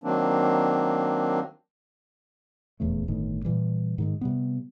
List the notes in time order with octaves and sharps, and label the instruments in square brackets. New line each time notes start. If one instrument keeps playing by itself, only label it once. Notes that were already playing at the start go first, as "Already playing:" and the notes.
[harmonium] D#3 F#3 A#3 C4 D4
[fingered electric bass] D#1 E2 C#3 A3
G1 A2 D#3
A#2 E3 G3
G#2 D#3 G#3
C3 G3 B3